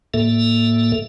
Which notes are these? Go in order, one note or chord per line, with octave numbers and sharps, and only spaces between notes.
A2 A#3 A4 E5